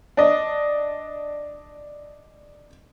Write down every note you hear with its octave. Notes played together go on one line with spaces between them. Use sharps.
D4 D#5